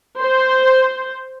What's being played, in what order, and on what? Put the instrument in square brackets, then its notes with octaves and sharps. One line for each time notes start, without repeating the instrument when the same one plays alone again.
[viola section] C5